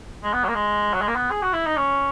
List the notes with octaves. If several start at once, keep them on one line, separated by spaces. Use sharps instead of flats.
G#3
B3
F#3
A#3
G#3
F#3
G#3
A#3
B3
G#4
F#4
E4
D#4
C#4